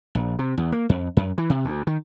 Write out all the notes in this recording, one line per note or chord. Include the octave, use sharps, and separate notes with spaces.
A#1
C3
E2
A#3
F2
F#2
E3
C3
D2
D#3